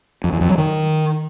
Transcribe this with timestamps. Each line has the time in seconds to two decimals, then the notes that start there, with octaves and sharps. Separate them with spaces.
0.24 F2
0.32 E2
0.41 F2
0.49 F#3
0.58 D#3